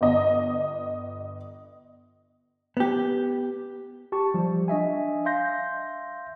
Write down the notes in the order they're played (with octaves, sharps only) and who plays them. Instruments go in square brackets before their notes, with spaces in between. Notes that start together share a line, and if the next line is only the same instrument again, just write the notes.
[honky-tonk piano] G1 D#5
[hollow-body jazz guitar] B3 G4
[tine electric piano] G4 A5 C#6
F3 G3
D4 D#5 E5 G#5
E5 F5 C6 G6 A#6